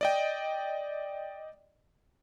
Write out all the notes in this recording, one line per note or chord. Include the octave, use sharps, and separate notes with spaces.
D5 D#5 G5